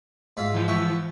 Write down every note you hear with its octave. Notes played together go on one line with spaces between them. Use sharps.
G#2 F4 E5
E3 F3
E5 F#5 C#6